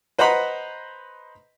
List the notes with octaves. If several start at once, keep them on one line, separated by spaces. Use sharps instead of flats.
B4 C5 D#5 F#5 A#5 B5